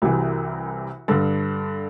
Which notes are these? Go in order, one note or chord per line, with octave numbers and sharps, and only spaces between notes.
C2 C3 E3 F#4
G2 D3 A4